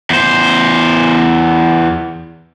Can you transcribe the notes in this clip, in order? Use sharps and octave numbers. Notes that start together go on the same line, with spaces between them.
E2 C5